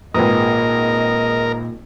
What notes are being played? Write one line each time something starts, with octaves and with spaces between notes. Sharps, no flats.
G#1 A#2 G#3 A#4 B4 D#5 D#6